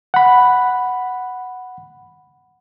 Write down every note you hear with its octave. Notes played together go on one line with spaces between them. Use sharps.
F#5 B5